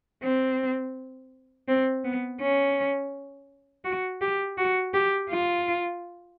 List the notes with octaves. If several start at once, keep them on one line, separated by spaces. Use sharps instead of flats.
C4
C4
B3
C#4
F#4
G4
F#4
G4
F4